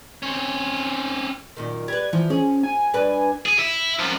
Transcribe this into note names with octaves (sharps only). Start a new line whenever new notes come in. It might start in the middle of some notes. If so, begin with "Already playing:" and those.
C4 C#4
F#2 A#2 D#3
G3 B4 G#6
E3 F3
C#4 G#4
G#5
G2 D4 B4
G#4
E4
F#2 F3